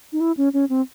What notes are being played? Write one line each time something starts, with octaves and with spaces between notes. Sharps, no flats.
D#4
E4
C#4
C#4
C4